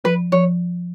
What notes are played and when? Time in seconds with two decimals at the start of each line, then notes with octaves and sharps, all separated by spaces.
0.04 F3 B4
0.32 F3 C#5